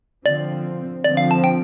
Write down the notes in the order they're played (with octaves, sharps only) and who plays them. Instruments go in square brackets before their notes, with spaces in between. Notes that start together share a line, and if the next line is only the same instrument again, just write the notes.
[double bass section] D3 F3 C4 [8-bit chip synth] D5
[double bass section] D3 F3 C4 [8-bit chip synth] D5
[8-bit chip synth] F5
A5
G5